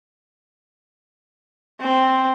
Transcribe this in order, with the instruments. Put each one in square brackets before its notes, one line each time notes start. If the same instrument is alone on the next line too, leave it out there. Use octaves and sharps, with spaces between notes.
[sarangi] C4